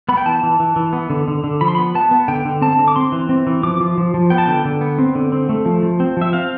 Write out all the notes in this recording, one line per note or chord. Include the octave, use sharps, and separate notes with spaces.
B3 B5
G5
E3 A5
E3
E3
E3
B3
D3
D3
D3
F3 B5
C6
B3 B5
B3 A5
B3
D3 G5
D3
C4 A5
D3
D6
C4 C6
E3
C4
E3
F3 D6
F3
F3
F3
B3 G5
A5
D3 G5
D3
B3
C4
D3
C4
A3
F3
F3
C4
F3 E5
C4 F5